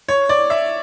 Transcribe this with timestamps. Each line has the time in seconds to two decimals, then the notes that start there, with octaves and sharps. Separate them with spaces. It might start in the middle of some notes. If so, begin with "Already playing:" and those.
0.08 C#5
0.29 D5
0.50 E5